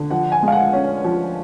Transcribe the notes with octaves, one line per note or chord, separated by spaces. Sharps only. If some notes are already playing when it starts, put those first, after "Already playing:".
Already playing: D3
F3 F#5
G#5
G#3
F5
F#5
C#4
F3